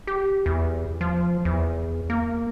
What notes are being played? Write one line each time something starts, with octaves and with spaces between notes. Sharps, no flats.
G4
E2
F3
E2
A#3